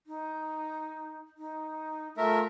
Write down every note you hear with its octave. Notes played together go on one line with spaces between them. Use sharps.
D#4
D#4
A3 F4 A#4 E5